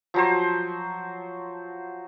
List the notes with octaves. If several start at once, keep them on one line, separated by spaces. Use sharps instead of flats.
F3 F#3 C5